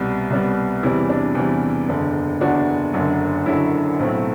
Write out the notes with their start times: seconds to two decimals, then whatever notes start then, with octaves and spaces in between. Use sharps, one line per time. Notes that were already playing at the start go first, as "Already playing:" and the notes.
Already playing: C2 B2 G3 B3 B4
0.30 C2 B2 G3 B3
0.83 E2 C3 E3 G3 E4
1.09 D4
1.35 E2 C3 E3 G3
1.88 F#1 E2 D3
2.41 F#1 E2 D3 D4 F#4
2.93 F#1 F#2 D3 F#3
3.46 F#1 F#2 D3 F#3 E4
3.99 B1 A2 F#3 A3 C4